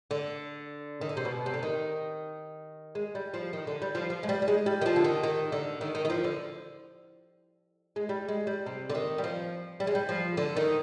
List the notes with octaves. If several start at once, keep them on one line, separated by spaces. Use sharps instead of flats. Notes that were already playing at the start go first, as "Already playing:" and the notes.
D3
D#3
D3
C3
B2
C3
D3
D#3
G#3
G3
F3
D#3
D3
G3
F3
F3
G#3
G3
G3
G#3
G3
D#3
F3
D3
D#3
D#3
D3
D#3
D#3
D#3
F3
D3
G#3
G3
G#3
G3
C3
D3
D#3
G3
F3
G3
G#3
G3
F3
D3
D#3